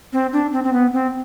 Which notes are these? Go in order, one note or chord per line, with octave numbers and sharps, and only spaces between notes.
C4
D4
C4
C4
B3
C4